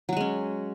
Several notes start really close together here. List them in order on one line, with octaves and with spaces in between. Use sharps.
F#3 F#4 G#3 C#4